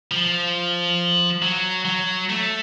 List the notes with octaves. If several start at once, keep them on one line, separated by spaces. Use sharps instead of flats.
F3
F#3
F#3
A3